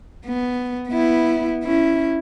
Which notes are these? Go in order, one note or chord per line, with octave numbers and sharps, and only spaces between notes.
B3
B3 E4
C#4 E4